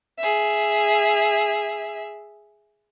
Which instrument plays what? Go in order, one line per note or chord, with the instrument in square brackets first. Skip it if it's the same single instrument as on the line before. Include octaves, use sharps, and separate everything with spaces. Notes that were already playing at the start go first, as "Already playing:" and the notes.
[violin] G#4 E5